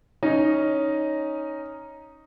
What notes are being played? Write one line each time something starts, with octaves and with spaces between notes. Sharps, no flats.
C#4 D#4 D#5